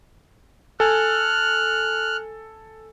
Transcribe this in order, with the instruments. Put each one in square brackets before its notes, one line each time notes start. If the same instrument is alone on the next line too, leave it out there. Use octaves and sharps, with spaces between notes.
[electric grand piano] A4 G#5 [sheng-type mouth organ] F6 F#6